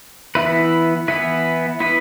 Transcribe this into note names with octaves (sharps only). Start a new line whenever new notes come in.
E3 B3 E4 B4
E3 B3 E4 B4
B3 E4 B4